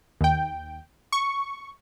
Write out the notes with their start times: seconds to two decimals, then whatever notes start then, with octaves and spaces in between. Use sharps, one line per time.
0.21 D#2 G5
1.12 C#6